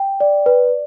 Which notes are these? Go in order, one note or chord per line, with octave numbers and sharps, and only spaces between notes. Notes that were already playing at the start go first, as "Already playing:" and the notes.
Already playing: G5
D5
B4